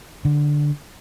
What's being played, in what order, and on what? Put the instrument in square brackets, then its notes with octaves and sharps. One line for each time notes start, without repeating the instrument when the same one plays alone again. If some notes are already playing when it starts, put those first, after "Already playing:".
[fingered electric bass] D3